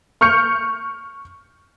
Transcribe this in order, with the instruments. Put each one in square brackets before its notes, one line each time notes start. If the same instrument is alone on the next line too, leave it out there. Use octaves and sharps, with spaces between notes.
[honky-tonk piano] C#6 F6 G6 C#7